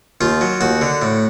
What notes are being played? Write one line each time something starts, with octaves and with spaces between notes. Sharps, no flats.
D#2 F4
F#3
D#2 F#4
D3
A2